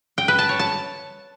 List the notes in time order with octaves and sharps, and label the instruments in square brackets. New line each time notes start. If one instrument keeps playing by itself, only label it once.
[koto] G5
B4
A5
C#5
A5